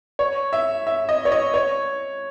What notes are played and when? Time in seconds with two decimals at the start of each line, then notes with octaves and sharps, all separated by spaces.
0.19 C#5
0.53 E5
0.87 E5
1.09 D#5
1.25 C#5
1.32 D#5
1.54 C#5